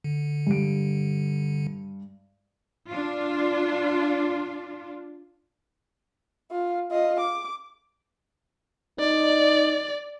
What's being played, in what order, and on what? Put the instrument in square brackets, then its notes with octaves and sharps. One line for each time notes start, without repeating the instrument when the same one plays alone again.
[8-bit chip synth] D3
[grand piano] G2 D7
[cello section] D4 F4
[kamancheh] F4
F4 D#5
D6
[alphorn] D#4 [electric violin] D5